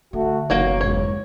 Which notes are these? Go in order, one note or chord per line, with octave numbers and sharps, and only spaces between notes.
D3 A3 F#4
F#1 B1 E2 A#3 F#4 C#5
F2 G#2 C#5